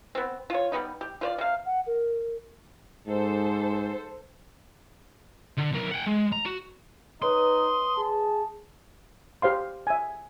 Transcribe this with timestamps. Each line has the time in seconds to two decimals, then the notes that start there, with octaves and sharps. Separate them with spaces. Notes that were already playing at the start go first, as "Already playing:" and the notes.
0.15 B3 C4
0.50 F4 C#5
0.72 G3 G#3 B3 D#4
1.01 G4
1.21 F4 C5 D5
1.38 C3 F5
1.65 F#5
1.86 A#4
3.08 G#2 A4 C5
5.58 D3
5.72 B1 A#4
5.92 F#5 G5
6.07 G#3
6.32 A#5
6.46 F#4
7.22 D#4 B4 C#5 C6 D#6
7.97 G#4 A5
9.42 G4 C5 F5 C6
9.87 E5 G#5